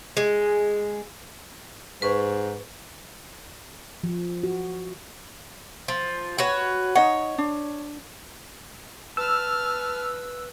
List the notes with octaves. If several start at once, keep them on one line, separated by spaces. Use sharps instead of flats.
G#3
G#2 B4 C#6
F3
F#4
F3
F#4 B4 C#5
D#4 C#5 D#5 F#5
D4
B4 A5 E6 F6